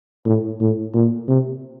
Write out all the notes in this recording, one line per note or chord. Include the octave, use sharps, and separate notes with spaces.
A2
A2
A#2
C3